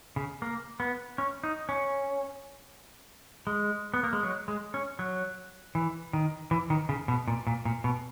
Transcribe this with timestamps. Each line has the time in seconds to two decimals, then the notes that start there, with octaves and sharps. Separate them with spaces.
0.16 C#3
0.42 A#3
0.80 B3
1.18 C#4
1.44 D#4
1.69 C#4
3.47 G#3
3.94 B3
4.03 A#3
4.13 G#3
4.23 F#3
4.48 G#3
4.74 C#4
4.99 F#3
5.75 E3
6.13 D#3
6.51 E3
6.70 D#3
6.89 C#3
7.08 B2
7.28 A#2
7.47 A#2
7.65 A#2
7.84 B2